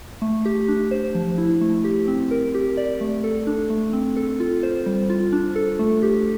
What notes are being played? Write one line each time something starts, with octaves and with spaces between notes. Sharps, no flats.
A3
G4
D4
C5
F3
E4
A3
G4
C4
A#4
G4
D5
A3
A4
D4
A3
C4
A4
F4
C5
G3
F4
D4
A4
A3
G4